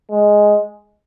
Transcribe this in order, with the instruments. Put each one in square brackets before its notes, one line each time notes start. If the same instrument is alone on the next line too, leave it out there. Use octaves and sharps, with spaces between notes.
[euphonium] G#3